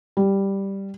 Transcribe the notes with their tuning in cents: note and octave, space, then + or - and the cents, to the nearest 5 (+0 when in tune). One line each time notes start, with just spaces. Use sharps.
G3 +0